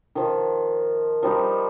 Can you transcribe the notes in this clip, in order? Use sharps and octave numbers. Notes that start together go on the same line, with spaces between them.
D#3 F3
F3 G3 D#4